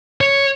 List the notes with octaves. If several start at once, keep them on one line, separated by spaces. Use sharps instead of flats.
C#5